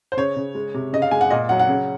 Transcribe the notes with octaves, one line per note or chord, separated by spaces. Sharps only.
C5
C#3 C#5
C#3
G#3
C3
C#3 D#5
F5
G#3 G#5
F#5
A#2 D#5
F#3 F#5
F#5
C#3